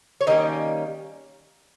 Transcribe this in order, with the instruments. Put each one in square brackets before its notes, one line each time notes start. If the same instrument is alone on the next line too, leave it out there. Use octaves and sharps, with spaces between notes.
[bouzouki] C#5
D#3 G3 A#3 C#4 D#5